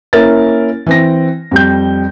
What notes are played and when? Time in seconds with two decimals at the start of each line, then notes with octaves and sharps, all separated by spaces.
0.13 A#3 C#4 E4 A#4 A6
0.86 E3 C4 A#6
1.51 F2 G3 G6